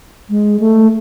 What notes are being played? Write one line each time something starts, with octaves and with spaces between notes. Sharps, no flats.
G#3
A3